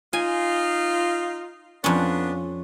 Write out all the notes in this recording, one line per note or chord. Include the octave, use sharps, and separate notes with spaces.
D#4 F4 G#5
F2 B3 C#4 D4